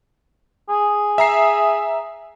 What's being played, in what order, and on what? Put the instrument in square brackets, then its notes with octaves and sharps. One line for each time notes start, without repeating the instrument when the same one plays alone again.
[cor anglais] G#4
[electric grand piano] E5 A#5 C7